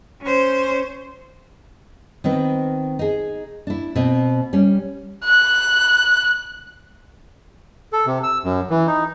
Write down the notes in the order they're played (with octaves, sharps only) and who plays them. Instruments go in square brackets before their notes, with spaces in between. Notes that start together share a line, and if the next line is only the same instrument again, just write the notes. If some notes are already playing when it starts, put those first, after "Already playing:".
[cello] C#4 C5
[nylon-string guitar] D#3 B3 C4 B4
D#4 G#4
D4 E4
B2 C4
G3 C#4
[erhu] F#6
[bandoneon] A4
C3
E6
F#2
E3
D#4